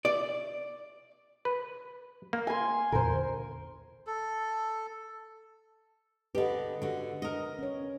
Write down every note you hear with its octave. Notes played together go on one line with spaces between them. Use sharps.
D5
B4
A#3
G#5 C6
E2 A#2 D3 A#4 C5
A4
D3 G4 B4 D#5
D3 F#4
A#4 D#5
C#4 C#5